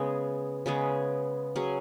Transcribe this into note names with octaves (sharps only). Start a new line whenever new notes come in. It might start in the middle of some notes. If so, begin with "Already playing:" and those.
Already playing: C#3 G#3 B3 G#4
C#3 G#3 B3 G#4
F#3 C#4 G#4